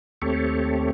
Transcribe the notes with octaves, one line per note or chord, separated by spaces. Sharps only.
D#2 A3 C4 G4 A4 C#5